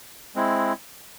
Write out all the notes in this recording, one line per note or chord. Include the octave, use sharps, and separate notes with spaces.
G#3 C4 E4